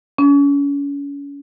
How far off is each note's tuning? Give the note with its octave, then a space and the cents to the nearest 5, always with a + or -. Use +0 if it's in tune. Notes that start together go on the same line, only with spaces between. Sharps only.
C#4 +35